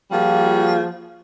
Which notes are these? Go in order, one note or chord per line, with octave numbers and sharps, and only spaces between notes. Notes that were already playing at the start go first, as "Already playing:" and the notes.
F3 G3 A#3 F4 F#4 G#4